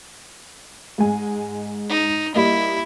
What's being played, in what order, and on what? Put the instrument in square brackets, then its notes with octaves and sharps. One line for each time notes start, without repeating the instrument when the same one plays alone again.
[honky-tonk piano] G#2 G#3 G#5
[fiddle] D#4
[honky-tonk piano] G3 A#3 D#5 [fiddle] E4